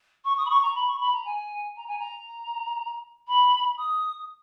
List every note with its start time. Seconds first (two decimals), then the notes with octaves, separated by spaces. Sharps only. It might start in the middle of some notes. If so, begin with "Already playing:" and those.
0.24 C#6
0.37 D#6
0.45 B5
0.49 C#6
0.62 A#5
0.75 B5
0.87 C#6
1.00 B5
1.13 A#5
1.25 G#5
1.76 A#5
1.87 G#5
1.98 A#5
3.27 B5
3.78 D#6